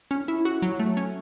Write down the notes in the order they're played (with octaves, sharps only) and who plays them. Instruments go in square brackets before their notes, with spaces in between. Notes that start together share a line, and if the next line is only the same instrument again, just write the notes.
[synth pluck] C#4
E4
F#4
F#3
A3
C#4